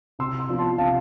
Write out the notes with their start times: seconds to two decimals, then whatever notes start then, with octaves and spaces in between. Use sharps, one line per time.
0.19 C3 C6 E6
0.39 C6 E6
0.49 F3 B3 D4 F4
0.58 A5 C6
0.78 C3 F5 A5